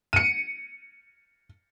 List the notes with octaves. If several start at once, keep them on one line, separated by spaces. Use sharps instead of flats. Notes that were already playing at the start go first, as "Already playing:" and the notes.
C#7 D#7